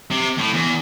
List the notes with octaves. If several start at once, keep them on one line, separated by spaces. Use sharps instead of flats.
C3
A2
E2